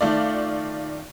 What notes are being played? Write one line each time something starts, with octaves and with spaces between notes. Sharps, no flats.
D#3 A3 F4 D5